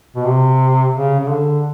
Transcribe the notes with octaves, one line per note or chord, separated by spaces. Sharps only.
B2
C3
C#3
C#3
D3